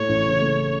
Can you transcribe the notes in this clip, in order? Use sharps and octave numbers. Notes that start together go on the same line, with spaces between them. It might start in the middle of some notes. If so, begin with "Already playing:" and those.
Already playing: A2 A3 C#5
A1
C#3
A3